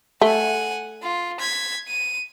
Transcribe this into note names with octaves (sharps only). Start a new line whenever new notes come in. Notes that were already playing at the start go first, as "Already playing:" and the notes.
A3 F#5 G#5
F4
G#6 B6
D#7